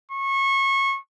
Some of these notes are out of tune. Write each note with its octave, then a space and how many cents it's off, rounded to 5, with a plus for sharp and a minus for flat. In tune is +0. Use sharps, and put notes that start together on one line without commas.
C#6 -25